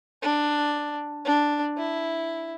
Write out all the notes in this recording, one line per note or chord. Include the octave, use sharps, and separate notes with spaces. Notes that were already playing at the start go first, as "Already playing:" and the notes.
D4
D4
E4